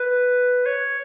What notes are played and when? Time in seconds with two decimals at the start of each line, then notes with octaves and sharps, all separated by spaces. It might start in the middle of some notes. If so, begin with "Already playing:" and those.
Already playing: B4
0.66 C#5